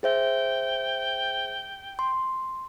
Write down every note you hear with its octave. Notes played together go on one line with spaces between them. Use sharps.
G#4 C5 E5 G5
C6